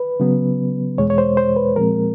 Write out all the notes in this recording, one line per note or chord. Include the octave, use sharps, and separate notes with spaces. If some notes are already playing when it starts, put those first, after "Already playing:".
Already playing: B4
C#3 F#3 B3
E2 B2 G#3 C#5
C#5
C5
C5
B4
A#2 F3 G#3 C4 A#4